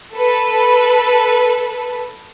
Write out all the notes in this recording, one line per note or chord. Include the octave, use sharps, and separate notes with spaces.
A4 B4